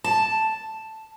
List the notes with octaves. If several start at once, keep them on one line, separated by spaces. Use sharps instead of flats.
A5